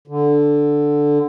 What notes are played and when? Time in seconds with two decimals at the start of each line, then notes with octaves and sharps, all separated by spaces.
0.08 D3